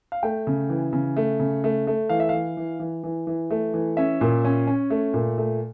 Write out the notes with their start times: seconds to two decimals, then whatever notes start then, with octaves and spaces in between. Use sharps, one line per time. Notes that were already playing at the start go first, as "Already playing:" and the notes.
0.12 F5
0.23 A3 G5
0.47 C#3
0.70 E3
0.93 C#3
1.16 A3
1.40 C#3
1.64 A3
1.87 A3
2.09 E3 F5
2.20 E5
2.29 E3 F5
2.57 E3
2.80 E3
3.03 E3
3.27 E3
3.50 A3
3.74 E3
3.97 C#4 E5
4.21 A#2
4.45 C#4
4.67 C#4
4.90 A3
5.14 A#2
5.38 A3